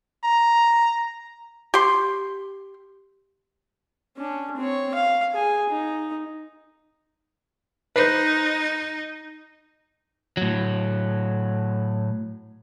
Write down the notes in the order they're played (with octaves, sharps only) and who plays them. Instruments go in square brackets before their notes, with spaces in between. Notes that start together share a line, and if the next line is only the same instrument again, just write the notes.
[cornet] A#5
[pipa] G4 C6
[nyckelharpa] C#4 D4
C4 C#5
F5
G#4 G#5
D#4
[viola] D#4 [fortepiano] B4 C5
[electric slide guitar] A2 F#3